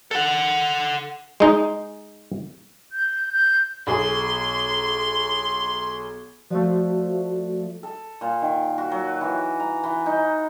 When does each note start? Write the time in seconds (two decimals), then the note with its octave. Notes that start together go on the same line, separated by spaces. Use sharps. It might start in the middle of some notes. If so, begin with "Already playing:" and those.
0.11 A4 F#5
1.40 G#3 D#4
2.92 G6
3.32 G6
3.87 B1 G#4 C6
6.50 F3 A3 F#4 D5
7.83 A4
8.21 A#2
8.42 D#3
8.78 F#4
8.91 F#3
9.21 E3
9.60 A#5
9.83 E3
10.06 D#4